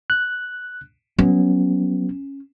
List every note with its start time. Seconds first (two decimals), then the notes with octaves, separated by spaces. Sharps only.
0.10 F#6
1.19 F#3 B3 C#4